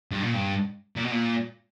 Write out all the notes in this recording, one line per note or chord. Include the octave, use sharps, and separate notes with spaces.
G2
A#2
G2
A#2
B2
A#2